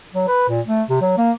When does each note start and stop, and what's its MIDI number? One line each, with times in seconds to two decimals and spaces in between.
0.14 0.27 54
0.28 0.48 71
0.49 0.61 46
0.67 0.83 57
0.90 0.99 48
1.02 1.15 54
1.18 1.31 58